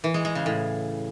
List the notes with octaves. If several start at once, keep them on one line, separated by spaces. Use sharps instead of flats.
E3
G#3
G#3
C#3
A2